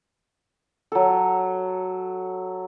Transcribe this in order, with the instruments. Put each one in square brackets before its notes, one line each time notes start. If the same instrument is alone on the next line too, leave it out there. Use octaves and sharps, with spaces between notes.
[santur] F#3 A4